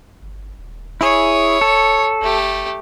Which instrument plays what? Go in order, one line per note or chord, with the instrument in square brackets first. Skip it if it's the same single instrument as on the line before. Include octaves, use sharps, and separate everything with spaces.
[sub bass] G1
D#1
[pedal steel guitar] E4 G#4 [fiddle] C#5
[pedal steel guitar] A4
[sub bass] F#1 [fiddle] A3 G4